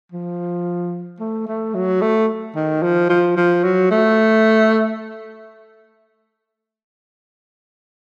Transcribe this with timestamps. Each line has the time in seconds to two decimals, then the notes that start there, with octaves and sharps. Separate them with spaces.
0.12 F3
1.20 A3
1.47 A3
1.74 F#3
2.02 A3
2.55 D#3
2.83 F3
3.10 F3
3.37 F3
3.64 F#3
3.91 A3